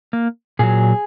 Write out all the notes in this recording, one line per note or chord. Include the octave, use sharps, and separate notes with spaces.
A#3
A#2 F#3 G#4